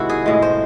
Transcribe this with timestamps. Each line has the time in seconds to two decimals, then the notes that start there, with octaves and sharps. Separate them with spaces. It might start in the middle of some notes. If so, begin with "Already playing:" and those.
Already playing: C3 D#3 G#3 E4 F#4
0.10 G#4
0.26 A2 G#3
0.42 C5